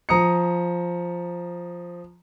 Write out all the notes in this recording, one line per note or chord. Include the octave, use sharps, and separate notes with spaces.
F3 A#5 D#6 C#7